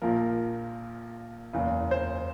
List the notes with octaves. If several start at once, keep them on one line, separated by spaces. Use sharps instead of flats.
A#1 A#2 F3 A#4
F#1 E2 C#3
C5